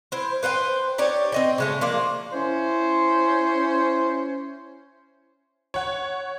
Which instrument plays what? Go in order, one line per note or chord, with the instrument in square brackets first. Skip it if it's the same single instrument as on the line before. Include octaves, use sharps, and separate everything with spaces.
[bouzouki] E4 C5
B4 C5 F#5 G5
D#4 G4 C#5 D5
C4 D#5 G5
C#3 G#3 A3
F3 A#3 D5
[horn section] C#4 E4 C5
[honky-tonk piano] C#5 F#5